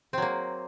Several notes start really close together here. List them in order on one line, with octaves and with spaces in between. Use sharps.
C4 F#3 A#3